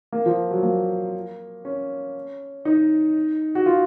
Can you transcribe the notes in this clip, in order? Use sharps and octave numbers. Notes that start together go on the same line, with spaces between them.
A#3
F3
F#3
A#3
C#4
D#4
F#4
F4